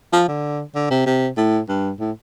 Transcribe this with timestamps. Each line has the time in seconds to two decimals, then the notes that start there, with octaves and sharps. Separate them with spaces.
0.13 F3
0.28 D3
0.75 D3
0.90 C3
1.06 C3
1.37 A2
1.69 G2
2.00 A2